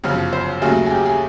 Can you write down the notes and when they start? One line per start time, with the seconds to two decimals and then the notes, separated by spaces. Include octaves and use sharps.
0.04 G1 F#2 C#3 F3
0.33 C5
0.62 D#2 C#3 F#3 A3 G#4
0.86 G#4
0.91 G4
1.06 G#4